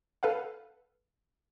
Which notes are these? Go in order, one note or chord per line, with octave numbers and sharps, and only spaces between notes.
A4 B4 F5 F#5